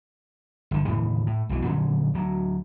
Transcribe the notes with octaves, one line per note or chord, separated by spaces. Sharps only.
G1 D3
D#2 A2 C#3 E3
A2
B1 B2 E3
A#2 D3 F#3 C#4
D2 F#3